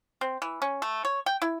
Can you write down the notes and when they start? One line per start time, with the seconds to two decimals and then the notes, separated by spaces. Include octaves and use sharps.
0.21 C4
0.42 E3
0.62 C#4
0.82 A3
1.05 C#5
1.26 G5
1.42 E4